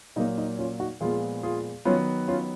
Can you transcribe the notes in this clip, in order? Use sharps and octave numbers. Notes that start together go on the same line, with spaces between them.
A#2 F#3 A#3 D#4
D#4
C#4 F4
D#4 F#4
A#2 F3 G#3 B3 F4 G#4
F4 G#4
D#3 F#3 B3 C#4 F4
C#4 F4